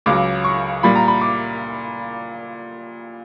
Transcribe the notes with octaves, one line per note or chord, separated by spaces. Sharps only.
C#2 C#3 F#3 D6
C#6
A#2 G3 B5
A#5
B5
D6